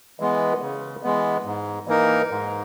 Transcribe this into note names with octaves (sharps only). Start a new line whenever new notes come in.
E3 G#3 B3
C#3
E3 G#3 B3
G#2
E3 A#3 D#4 A#4
G#2